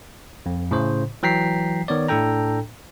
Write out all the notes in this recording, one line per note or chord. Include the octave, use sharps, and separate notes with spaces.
F2
A2 C#3 C5
E3 F#3 G5 A#5 B6 C7
D#3 B3 C#5 D5
A2 D4 A4 G5 A#5